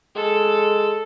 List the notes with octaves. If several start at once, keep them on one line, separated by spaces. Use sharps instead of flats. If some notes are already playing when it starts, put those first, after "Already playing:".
G#3 A4